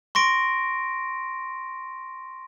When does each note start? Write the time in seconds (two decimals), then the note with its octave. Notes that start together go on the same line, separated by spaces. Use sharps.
0.15 C6 C#6 A#6 D7